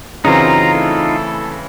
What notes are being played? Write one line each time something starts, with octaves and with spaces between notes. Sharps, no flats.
F#2 C#3 E3 C4 D#4 F4 F#4 A#5
A3 E4 A4